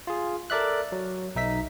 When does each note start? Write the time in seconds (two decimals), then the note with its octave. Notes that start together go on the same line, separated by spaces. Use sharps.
0.07 F4 G#4
0.50 A4 A#4 D5 E5 F#6
0.92 F#3
1.35 B1 D#4 E5 B6